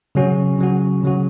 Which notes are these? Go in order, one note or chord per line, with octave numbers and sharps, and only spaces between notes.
C#3 F#3 C#4 F#4
C#3 F#3 C#4 F#4
C#3 F#3 C#4 F#4